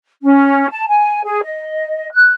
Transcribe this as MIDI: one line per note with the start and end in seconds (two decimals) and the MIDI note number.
0.22 0.67 61
0.70 0.87 81
0.88 1.20 80
1.24 1.41 68
1.42 2.07 75
2.12 2.32 90